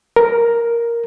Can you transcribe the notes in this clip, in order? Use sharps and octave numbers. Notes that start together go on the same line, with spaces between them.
A#4